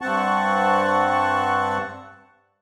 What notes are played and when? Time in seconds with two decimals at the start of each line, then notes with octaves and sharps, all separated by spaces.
0.01 G2 C4 F#5 A5 C#6